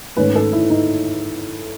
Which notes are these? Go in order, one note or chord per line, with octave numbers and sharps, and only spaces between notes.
G#2 D#3 A3 C#4 B4
A4
E4
D#4